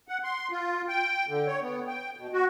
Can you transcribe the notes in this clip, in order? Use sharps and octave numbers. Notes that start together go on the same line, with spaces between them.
F#5
C6
F4
G5
D3
C#5
B3
G5
B2
F#4